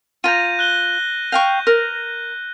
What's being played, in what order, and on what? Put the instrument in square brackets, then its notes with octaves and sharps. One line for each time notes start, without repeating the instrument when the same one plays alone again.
[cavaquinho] F4 A#5 [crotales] G6 A#6 D#7
[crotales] F#6 G7
[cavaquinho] F5 G5 C#6 [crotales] G6
[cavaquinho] A#4